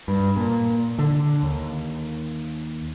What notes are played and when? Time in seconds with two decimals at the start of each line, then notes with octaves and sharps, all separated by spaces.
0.08 G2
0.37 A#2
0.99 D3
1.43 D#2